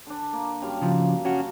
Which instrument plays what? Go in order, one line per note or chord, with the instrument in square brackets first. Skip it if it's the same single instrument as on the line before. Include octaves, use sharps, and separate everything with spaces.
[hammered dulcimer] D3 D4
A#3
F#2 G3 F5
[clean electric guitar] C#3 F3
C#4 F#4